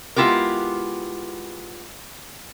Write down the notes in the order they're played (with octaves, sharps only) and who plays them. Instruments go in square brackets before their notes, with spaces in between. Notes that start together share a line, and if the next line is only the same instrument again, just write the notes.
[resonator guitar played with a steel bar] G#3 B3 E4 F4 G4 A#4